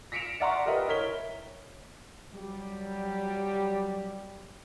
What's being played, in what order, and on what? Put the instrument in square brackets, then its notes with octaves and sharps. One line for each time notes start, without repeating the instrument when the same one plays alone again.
[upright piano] A#6 B6 C#7 D7 E7 F7
D5 E5 F#5 A#5 C6 C#6
G4 A#4 B4 D#5 E5
E4 A#4 C#5 B6 G7
[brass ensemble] F#3 G3 G4